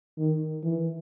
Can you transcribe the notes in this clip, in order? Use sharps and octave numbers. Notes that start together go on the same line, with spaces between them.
D#3
E3